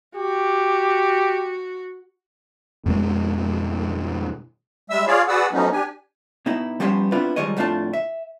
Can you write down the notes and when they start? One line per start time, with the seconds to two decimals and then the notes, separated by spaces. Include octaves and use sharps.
0.16 F#4 G4
2.86 F2 B2 G#3
4.90 G3 G#3 E5 E6
5.07 F4 G#4 C#5 D5 F5
5.28 F#4 G#4 B4 D5 F#5 E6
5.53 F3 F#3 A3 B3 C#4 D#4
5.72 D4 G4 G#5
6.46 B2 B3 D#4 E4
6.80 F3 G3 B3 C#4 G4 C5
7.12 B3 C4 D4 E4 F4 B4
7.36 D#3 F3 G3 G#3 C#5 D#5
7.57 F2 A2 A3 D4 F4 A5
7.93 E5